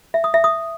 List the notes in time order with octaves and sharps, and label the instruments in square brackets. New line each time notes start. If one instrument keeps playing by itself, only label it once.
[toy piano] E5
D#6
E5
D#6